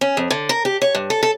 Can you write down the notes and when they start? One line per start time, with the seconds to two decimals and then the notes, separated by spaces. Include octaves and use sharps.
0.01 C#4
0.17 F2
0.31 D3
0.49 A#4
0.65 G4
0.82 C#5
0.95 G2
1.10 A4
1.23 A4